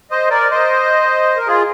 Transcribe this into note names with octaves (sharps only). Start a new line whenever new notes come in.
C5 D#5
A#4 D5
C5 D#5
A#4
F4 G#4